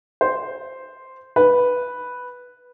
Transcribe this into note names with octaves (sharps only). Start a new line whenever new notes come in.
C5
B4